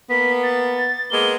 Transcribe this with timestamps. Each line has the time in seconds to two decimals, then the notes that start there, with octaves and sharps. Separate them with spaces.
0.10 A#3 B3 B6
0.43 A6
1.10 G#3 A#3 B3 G7